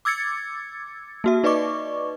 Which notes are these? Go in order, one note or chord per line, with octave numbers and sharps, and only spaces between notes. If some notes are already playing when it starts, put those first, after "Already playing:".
D6 E6 G#6 A6 C#7
A#3 F#4 E5
D#4 B4 D5 D#5 C#6 D6